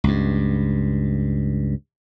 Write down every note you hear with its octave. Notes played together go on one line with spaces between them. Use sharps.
C#2 G2